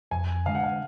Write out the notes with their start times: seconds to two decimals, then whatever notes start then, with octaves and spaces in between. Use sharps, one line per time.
0.11 F2 G#5
0.46 D3 G#3 F5
0.55 F#5
0.64 F5